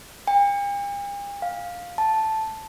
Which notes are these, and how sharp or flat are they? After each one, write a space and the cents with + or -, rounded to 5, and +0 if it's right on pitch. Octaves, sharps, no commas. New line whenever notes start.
G5 +45
F5 +10
A5 -5